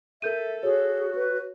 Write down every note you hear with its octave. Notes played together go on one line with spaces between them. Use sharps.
A4 A#4 E5 G6 D#7
F#4 G#4 C#5
B4